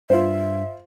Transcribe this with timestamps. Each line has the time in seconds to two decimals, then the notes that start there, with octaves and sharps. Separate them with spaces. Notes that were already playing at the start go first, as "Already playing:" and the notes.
0.10 G2 F4 C5 E5